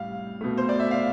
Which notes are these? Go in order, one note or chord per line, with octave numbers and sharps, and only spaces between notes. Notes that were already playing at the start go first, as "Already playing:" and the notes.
Already playing: A2 G3 F5
B2 A3
C5
D5
E5
F5